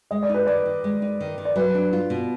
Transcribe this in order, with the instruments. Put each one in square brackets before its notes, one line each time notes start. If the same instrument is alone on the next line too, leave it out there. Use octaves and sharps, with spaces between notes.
[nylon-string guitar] G#3 [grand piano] D#5
[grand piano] D5
[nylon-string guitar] D#4
[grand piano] B4
[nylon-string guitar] D#3 [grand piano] D5
[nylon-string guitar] D#3
G#3
D#4
D#3
D#3
[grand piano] D5
[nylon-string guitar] F#3 [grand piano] B4
[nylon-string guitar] D4
F4
B2